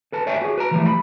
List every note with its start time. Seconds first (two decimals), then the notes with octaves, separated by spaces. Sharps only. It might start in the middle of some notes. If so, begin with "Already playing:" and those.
0.12 A4 B4 A5
0.26 B4 C#5 E5 G5 G#5
0.42 F#4 G#4
0.57 B4 A5 A#5
0.71 E3 F3 G3 A3 E4
0.86 B5